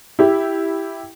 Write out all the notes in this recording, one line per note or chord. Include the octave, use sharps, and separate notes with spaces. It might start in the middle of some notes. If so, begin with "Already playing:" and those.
E4 G4